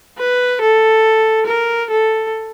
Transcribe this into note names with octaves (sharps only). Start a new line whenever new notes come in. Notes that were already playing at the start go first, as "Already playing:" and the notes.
B4
A4
A#4
A4